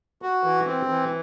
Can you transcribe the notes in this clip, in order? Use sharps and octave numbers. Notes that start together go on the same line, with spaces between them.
F#4
E3
C4
E3